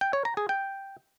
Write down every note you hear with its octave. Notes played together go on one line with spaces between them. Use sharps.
G5
C#5
A#5
G#4
G5